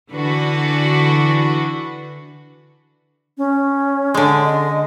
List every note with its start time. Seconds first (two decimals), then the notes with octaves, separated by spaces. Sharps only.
0.11 D3 E3 D4 F#4 B4
3.38 C#4
4.14 D3 G#3
4.45 D#5